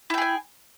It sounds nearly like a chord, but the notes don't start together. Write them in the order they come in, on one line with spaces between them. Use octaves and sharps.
E4 G5 G#4 G#5